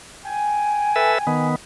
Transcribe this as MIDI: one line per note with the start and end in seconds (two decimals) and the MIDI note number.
0.24 1.46 79
0.24 1.46 80
0.96 1.18 69
0.96 1.18 71
0.96 1.18 76
1.27 1.55 51
1.27 1.55 59